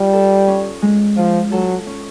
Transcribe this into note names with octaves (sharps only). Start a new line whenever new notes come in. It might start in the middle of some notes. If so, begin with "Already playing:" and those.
Already playing: G3 F4
A4
C#4
G#3
F3 F4
F#3 A4
C#4